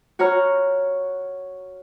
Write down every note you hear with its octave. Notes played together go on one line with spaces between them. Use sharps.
F#4 C#5 A#5 F6